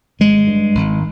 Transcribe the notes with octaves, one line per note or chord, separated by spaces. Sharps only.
G#1 G#3
G2
G#1